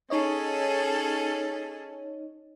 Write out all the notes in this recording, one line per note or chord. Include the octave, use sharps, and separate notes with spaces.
C#4 D#4 G#4 A4 C#5 D#5